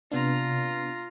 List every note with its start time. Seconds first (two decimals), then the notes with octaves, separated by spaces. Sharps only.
0.12 C3 B3 D4 F4 A#5